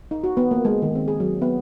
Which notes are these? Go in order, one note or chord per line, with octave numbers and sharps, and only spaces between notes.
D#4
F#4
B3
A#3
G#3
D#3
C4
G#4
F#3
B3